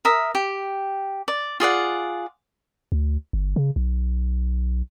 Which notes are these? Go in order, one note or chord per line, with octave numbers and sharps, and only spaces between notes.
A#4 E5 D#6
G4
D5
F4 G#4 D5 F#5
D2
G1
C#3
B1